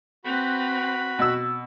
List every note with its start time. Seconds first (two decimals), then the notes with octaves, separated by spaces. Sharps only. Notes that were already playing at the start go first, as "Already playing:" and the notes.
0.24 C4 F#4 B4 B5
1.19 B2 E6